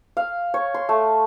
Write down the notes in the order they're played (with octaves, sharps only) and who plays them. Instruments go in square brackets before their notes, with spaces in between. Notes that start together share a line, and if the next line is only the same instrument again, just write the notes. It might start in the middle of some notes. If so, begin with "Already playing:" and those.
[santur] F5
C#5
C6
A3